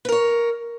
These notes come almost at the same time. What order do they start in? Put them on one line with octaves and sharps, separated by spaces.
B4 A#4 C#5